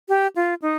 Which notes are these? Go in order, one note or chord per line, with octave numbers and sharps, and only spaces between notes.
G4
F4
D#4